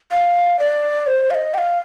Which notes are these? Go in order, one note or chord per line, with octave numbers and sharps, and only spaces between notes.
F5
D5
C5
F5
D#5
G5
F5